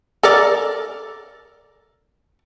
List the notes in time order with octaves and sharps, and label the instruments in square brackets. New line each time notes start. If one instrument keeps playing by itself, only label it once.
[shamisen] A4 A#4 D5